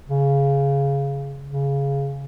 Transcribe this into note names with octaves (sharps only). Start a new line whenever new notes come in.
C#3
C#3